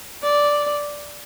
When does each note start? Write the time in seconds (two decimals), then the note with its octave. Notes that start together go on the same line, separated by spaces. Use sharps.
0.23 D5